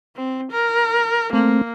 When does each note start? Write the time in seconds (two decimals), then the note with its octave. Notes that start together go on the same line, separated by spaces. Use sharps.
0.16 C4
0.52 A#4
1.33 A3 A#3 C4